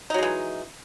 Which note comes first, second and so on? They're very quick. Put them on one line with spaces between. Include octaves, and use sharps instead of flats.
D#4 F#3 G#3 E3